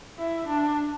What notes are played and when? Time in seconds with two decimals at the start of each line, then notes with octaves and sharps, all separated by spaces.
0.18 E4
0.47 D4